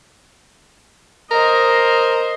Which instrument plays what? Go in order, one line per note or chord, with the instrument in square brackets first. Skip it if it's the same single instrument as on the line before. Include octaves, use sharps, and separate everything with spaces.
[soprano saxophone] A#4 [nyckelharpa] C5 D#5